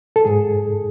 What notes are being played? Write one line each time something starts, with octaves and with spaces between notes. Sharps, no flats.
A4
G#2 G#4